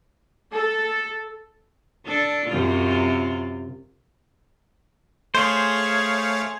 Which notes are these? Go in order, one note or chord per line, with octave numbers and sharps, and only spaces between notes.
A4
D4 A4
F#2 C3 F4
A3 G#4 C5 C#5 F5